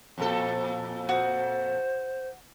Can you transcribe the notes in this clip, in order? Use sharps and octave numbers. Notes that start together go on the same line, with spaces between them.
F2 A#2 A4
F#4 C5 D#6